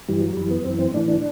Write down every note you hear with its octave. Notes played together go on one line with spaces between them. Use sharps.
G2 E3 G3
F#3
F#2 E3 G3
B3
F#2 C4
E3
C4
A2 E3 D4
D4